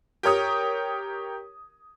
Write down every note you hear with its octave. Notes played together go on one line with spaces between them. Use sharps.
G4 A#4 C#5 D#6